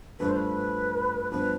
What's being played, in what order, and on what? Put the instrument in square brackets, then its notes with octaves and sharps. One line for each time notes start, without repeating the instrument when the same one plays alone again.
[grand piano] G2 F3 A3 [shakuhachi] B4
[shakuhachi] C5
B4
[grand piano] G2 F3 B3 [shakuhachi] B4